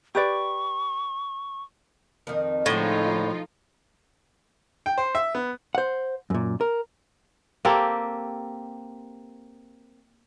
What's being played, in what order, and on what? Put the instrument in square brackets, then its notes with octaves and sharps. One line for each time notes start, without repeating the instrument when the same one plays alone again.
[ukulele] G4 B4 D5 [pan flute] C#6
[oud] F2 D#3
[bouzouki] A2 [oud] D3 G#3 [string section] F3 D#4 F4
[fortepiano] G5
C5
E5
B3
[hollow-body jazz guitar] C5 F#5
F#2 A#2
A#4
[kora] A#3 C4 G4 A4